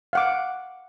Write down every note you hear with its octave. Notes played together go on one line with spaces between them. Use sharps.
F5 F#5 D6